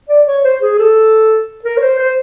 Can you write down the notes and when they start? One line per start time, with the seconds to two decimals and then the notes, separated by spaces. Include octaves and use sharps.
0.09 D5
0.27 C#5
0.44 C5
0.62 G#4
0.79 A4
1.64 A#4
1.77 C#5
1.82 C5
1.99 C5